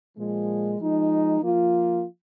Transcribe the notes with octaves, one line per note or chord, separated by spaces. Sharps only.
A#2 F3 G#3
F3 G#3 D#4
F3 A#3 F4